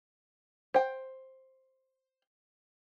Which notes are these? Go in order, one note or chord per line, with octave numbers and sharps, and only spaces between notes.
C5 G5